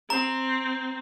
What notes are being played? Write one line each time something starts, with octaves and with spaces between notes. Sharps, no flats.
C4 A#5